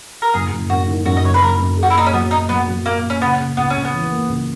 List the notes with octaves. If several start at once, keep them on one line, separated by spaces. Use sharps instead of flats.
A#4
F#1 G#4
F#1
F#2 F#4
D#3
F#2 F#4
D#5
F#1 C#5
B4
F#1 A#4
F#2
G#4
F#4
E4
A#2 D#4
C#4
F#3 B3
A#2 D#4
F#3 B3
F#3
A#2 A#3
A#2
C#4
C#3 B3
C#3
C#2 B3
C#4
C#2
B3
E3
A#3
C#2